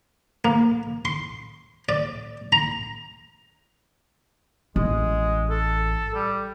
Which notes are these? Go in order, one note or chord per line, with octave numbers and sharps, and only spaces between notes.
A#3
C6
D5
A#5
A1 G#3
A4
G3